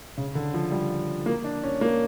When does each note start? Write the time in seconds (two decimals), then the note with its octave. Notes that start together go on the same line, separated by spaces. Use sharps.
0.18 C#3
0.35 D3
0.54 F3
0.72 G3
1.26 A#3
1.44 D4
1.63 C#4
1.81 A#3